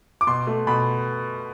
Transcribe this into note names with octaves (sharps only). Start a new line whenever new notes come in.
D6
B2 C6
A3
B2 B5